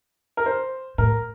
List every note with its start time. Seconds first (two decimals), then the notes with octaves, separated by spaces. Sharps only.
0.37 A#4
0.46 C5
0.98 A2 A#4